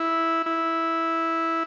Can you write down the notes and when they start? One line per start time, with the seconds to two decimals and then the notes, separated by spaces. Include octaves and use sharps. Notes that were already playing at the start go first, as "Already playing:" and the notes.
Already playing: E4
0.46 E4